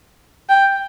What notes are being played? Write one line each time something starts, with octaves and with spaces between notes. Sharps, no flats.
G5